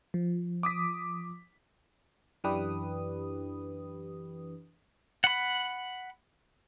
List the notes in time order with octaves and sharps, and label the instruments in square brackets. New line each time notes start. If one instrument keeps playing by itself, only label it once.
[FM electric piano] F3
[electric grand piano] D6 D#6 B6
[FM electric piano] F#2 E3 D4 G4 B4 D#6
[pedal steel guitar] F#5 B5